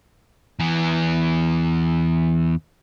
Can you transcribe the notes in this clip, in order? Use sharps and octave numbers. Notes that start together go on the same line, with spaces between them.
E2 E3